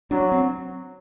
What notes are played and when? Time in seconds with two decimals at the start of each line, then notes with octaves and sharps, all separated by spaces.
0.11 F#3 D4
0.32 C4